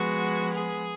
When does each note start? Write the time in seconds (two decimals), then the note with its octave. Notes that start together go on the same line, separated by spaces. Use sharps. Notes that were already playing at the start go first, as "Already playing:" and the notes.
Already playing: F3 G#3 B3 F#4
0.53 G#4